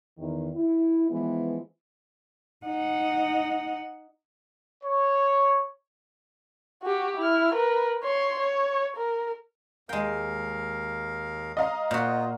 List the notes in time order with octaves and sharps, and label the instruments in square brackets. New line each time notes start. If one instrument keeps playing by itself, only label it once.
[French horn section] E2 D#3
E4
E3 F3 G#3 B3
[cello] D#4 F#5
[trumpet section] C#5
[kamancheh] F#4 G4
E4 F6
A#4 B4
C#5 C6
C#5
A#4
[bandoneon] D#2 A#4 F5 [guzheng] G#3 G5
[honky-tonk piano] D#5 F5 A#5
[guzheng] A#2 F#4 [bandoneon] F4 C5